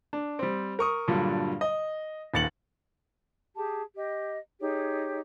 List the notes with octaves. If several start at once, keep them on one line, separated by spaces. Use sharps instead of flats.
D4
G3 C4
A#4 C#6 D#6
G2 A#2 D3 F#3 G3
D#5
D#1 D#2 A6 C#7 F#7
G4 G#4 A5
G4 D#5
D#4 G4 G#4 C#5